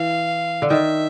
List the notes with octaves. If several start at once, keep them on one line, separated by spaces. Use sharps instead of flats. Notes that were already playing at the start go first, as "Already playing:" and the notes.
Already playing: E3 F5
D3
D#3 E5